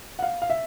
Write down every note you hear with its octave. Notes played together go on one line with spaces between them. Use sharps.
F#5
F5
F5
E5